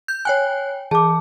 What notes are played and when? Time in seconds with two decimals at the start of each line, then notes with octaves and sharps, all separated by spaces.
0.08 G6
0.25 C#5 G5 G#5 F#6
0.91 E3 G#4 A5 D6